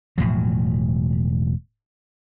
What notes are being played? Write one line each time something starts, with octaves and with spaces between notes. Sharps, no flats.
E1 A2 F3 F#3